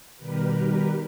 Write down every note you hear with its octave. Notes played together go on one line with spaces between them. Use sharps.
B2 D#3 G3 G4 A#4 B4